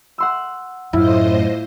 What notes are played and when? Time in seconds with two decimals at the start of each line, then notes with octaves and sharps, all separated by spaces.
0.18 F#5 C6 E6
0.93 F#2 A2 E4 F4 C5 D#5